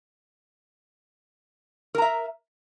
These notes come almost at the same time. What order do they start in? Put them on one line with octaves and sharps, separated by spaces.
A#4 A#5 E5